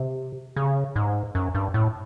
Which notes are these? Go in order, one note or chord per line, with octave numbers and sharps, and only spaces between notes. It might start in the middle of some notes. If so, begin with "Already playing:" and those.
Already playing: C3
C#3
G#2
F#2
G2
A2